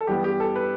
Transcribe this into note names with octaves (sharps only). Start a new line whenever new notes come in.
A4
G2 E3 G3 B3 G4
G4
A4
B4